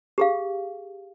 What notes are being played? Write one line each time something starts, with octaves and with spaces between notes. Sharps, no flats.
G4 G#4 F5